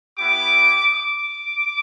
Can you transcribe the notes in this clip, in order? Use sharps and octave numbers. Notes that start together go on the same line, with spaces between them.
B3 E4 G4 D6
D6